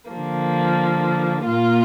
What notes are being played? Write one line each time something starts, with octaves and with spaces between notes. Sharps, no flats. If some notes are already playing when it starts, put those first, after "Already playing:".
D3 F3 A#3
A#2 A#3 F4